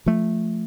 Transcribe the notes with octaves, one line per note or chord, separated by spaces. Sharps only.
F3 A3